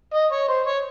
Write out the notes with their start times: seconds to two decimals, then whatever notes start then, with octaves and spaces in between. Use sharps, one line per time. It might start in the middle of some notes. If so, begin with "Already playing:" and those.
0.14 D#5
0.31 C#5
0.49 C5
0.66 C#5